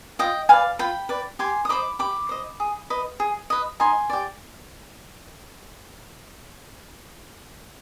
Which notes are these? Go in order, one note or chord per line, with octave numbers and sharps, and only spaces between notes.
F4 D#5 G5
B4 D5 F5 G#5
F4 G5 B5
B4 D5
G4 G#5 C6
D#6
C5 D#5 B5 D6
G4 B5 D6
C5 D#5
G#4
B4 D#5
G#4
B4 D#5
D#4 G#5 C6
G4 D5